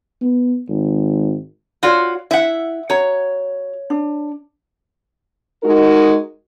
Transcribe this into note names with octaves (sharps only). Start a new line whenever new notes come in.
B3
G#1
F4 F#4 C#5 D5
E4 E5 F#5
F#4 C#5 A#5
D4
G#3 D#4 F#4 A#4